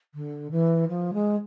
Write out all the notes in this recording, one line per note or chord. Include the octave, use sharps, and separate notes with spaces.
D3
E3
F3
G#3